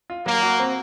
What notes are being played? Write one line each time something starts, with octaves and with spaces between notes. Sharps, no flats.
F4
F#3 A#3
F#4
C4